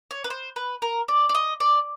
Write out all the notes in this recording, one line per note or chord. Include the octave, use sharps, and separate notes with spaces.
C#5
B4
C5
B4
A#4
D5
D5
D#5
D5